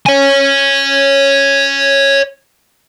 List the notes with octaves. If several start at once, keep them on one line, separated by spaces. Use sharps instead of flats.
C#5 G#5